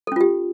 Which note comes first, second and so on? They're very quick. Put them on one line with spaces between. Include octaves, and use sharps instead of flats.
A4 C#4 F4 G4